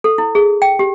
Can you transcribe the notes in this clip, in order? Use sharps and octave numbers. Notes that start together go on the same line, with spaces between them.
A4
E4
G#4
G5
G4